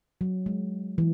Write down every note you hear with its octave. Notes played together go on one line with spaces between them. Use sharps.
F#3
G#3
E3